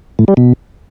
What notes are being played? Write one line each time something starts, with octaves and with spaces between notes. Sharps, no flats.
A2
G3
B2